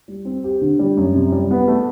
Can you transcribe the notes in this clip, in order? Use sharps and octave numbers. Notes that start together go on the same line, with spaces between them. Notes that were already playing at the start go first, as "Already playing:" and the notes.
G3
C4
G4
D3
G3
F#2
C3
G3
B3
A3